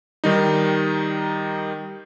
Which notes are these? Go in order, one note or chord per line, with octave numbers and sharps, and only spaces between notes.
D#3 G3 D#4